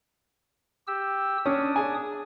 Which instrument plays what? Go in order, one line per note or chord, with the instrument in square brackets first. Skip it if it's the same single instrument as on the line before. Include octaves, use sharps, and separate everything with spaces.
[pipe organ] G4 E6
[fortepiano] C#4 [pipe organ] D4 D#6
[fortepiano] G#4 G#5